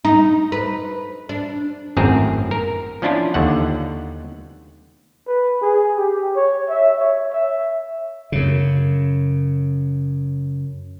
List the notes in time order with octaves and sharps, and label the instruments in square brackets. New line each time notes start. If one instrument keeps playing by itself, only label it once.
[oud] D#4
B4
D4
[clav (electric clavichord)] G#1 F#2 A2 C4 G#4 A#4
A#4
F3 C#4 D4 E4 F4
D#2 D3 F#5
[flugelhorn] B4
G#4
G4
C#5
E5
C#5
E5
[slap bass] F#2 C#3